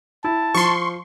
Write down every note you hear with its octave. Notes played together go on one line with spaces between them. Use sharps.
E4 A5
F3 C6 C#6